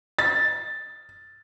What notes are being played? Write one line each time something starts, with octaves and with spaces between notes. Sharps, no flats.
A6